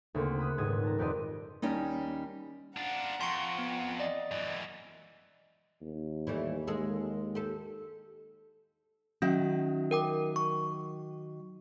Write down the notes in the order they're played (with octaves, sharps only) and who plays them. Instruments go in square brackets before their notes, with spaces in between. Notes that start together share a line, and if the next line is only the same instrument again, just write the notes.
[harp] D2 C#3 A#3 C4
B5 D#6 F#6
D#1 G#2 B4 D#6 G#6 E7
A5 A#5
D#1 F2 G4 B4 D5 D#5
[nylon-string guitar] D#2 G3 C#4 D#4
[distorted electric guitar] D4 F4 [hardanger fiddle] F#5 A#5
[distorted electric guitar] F2 [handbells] C6 C#6
[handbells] B3
D5 D#5
[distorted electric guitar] F#2 E3
[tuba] D#2
[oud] E3 G3 A3
G#3 G#4 A4
G4 A4
[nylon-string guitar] D#3 F#3 E5 [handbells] C#4
[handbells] A#4 G5 D6
C#6